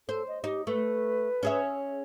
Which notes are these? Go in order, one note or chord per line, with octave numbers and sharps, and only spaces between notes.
A4 C5
D#5
D#4 G4
A3 B4
C#4 G#4 E5